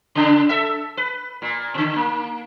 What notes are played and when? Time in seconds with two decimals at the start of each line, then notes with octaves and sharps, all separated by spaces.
0.15 C#3 D4
0.49 A4 E5
0.97 B4
1.42 A#2
1.74 B2 D3
1.96 A#3